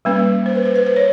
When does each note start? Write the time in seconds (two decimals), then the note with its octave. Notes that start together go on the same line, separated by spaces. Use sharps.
0.05 G3 A#3 C#4 B4
0.46 C5
0.55 B4
0.66 C5
0.76 B4
0.86 C5
0.96 C#5